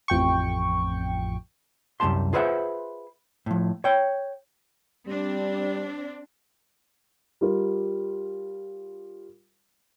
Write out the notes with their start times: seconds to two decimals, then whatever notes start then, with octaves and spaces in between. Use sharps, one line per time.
0.08 A1 F2 G5 C#6
2.00 C2 F#2 A3 G4 A5 C6
2.33 F4 G#4 B4 C5 E5 F#5
3.46 A2 F3
3.84 C#5 G5
5.08 G3 C4 D4
7.41 G3 F4 A#4